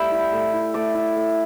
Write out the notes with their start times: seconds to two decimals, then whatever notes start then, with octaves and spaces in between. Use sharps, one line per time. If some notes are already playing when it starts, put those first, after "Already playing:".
Already playing: G3 A3 E5 G5 B5
0.11 E4
0.32 A3
0.54 E4
0.74 A3 D5
0.95 E4
1.16 A3